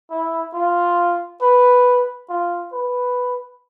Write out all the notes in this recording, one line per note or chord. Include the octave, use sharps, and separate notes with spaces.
E4
F4
B4
F4
B4